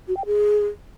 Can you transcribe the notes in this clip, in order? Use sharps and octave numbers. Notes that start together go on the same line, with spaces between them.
F#4
G5
G#4